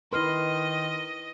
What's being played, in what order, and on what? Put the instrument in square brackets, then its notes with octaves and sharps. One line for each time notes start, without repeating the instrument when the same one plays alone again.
[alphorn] D#3 [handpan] E4 B4 [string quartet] D#5 [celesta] C6 F6 C7